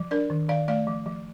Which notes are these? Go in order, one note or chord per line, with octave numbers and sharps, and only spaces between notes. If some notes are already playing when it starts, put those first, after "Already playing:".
Already playing: F3
D4 A#4 D5
D#3
D#3 D5 F5
A3 D5 F5
F3
F3